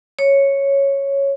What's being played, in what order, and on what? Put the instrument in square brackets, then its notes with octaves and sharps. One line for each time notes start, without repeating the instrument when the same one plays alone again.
[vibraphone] C#5